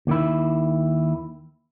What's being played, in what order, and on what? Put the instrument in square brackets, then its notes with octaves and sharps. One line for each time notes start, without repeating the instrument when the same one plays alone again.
[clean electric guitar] D#2 D#3 E4